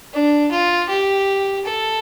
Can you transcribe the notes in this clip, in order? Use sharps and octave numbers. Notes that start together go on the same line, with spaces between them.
D4
F4
G4
A4